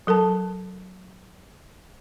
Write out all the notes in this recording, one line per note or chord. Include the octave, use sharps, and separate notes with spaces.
F#3 A4 A#4 A5